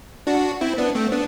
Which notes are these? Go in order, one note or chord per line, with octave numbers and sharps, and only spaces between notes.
D4 F#4
C4 E4
B3 D4
A3 C4
B3 D4